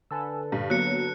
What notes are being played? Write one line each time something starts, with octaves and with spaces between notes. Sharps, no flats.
D3 A4 B4 G#5 A5 E6
G2 A#2
F#3 A#3 B3 F#6 C#7